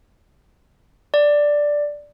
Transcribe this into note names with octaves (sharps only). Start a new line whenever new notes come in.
D5